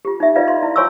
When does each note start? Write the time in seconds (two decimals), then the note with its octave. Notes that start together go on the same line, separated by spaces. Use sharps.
0.05 F4 G4
0.20 D#4 E5
0.35 F4 B4 D5 D#5 F5
0.48 C6
0.63 E4
0.76 F4 C#5 G#5 C6 C#6 E6